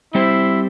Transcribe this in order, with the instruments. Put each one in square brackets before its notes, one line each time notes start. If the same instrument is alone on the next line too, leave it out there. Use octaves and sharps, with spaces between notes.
[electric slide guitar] G3 C4 G4 C5 [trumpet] E4